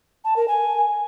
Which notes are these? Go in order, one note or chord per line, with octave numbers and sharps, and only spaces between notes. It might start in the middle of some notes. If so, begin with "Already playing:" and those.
A5
A#4
G#5